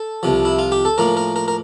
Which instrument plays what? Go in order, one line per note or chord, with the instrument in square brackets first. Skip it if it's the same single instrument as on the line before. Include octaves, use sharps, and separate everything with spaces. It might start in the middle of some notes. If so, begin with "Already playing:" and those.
Already playing: [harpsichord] A4
C2 C3 F3
E4
F4
G4
A4
A2 F3 A#3 A#4
A#4
A#4
A#4